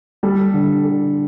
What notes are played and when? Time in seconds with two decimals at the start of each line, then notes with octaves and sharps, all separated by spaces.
0.23 G3 A4
0.54 D3
0.84 A4